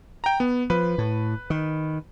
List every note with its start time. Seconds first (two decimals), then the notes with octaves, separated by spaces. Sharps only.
0.24 G5 A#5
0.40 B3
0.70 F3 B4
0.98 A2
1.50 D#3